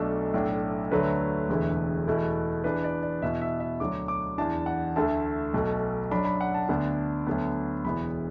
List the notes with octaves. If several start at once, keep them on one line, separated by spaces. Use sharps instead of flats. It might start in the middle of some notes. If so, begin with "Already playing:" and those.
Already playing: B1 B2 A3 D4 A4
B1 A2 A3 D4
D2 D3 F#3 A3 D4 B4
E1 E2 D3 A3 E4
E2 B2 A3 E4
E2 E3 D4 B4
D5
D5
E2 B2 B3 E4 E5
E5
E5
D2 D3 F#3 D4 D6
D6
E2 E3 D4 A5
F#5
D2 D3 A3 A5
B1 B2 A3
F#2 F#3 D4 B5
B5
F#5
A5
D2 D3 B3 D4
D2 D3 F#3 B3
E1 E2 E3 B3 B5